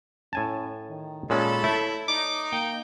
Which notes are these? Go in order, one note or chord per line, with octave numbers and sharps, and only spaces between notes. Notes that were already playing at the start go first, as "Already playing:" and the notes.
A2 C#4 G#5 A5
D#3
A#2 G#3 C#4 A4 C#5 A5 B5
A3 E4
D#4 D6
A#3 G5